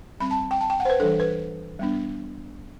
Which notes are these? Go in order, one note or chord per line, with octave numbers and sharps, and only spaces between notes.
G3 C4 B5
A5
G5
A5
G5
F#5
C5
B4
E3 G3 D4 A4
B4
G3 B3 D4